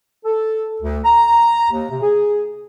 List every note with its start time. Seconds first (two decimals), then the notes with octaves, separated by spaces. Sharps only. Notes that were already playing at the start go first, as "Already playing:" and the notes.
0.24 A4
0.81 D2
1.04 A#5
1.70 D#2
1.90 C3
2.01 G#4